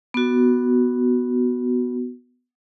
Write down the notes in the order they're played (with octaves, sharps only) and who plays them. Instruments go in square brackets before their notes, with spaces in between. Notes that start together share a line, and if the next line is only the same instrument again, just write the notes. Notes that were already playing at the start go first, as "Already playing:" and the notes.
[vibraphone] B3 F#4